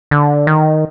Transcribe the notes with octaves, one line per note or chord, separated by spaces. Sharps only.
D3
D#3